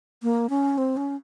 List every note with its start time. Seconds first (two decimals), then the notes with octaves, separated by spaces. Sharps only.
0.23 A#3
0.49 C#4
0.78 C4
0.97 C#4